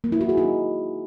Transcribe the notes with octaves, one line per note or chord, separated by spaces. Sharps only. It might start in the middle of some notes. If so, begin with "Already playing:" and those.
A#3
E4
F#4
G#4
D#4